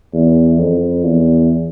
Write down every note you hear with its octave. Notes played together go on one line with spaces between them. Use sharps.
E2
F2
E2